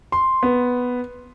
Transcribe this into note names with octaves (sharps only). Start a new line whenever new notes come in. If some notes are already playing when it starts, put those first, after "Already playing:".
C6
B3